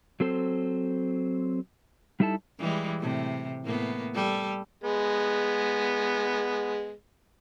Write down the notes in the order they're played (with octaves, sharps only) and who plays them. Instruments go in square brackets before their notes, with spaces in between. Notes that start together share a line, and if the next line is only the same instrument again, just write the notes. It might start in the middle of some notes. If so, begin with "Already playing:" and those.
[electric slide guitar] F#3 C4 A4 C5
G3 D#4 E4 A4 A5
[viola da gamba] E3 G3 G#3
A2 C3
A2 A#3 B3
G3 A4
[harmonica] G#3 B3